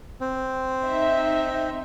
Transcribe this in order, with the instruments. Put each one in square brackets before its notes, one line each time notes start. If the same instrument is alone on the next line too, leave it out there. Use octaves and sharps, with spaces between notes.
[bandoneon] C4
[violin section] D#4 E5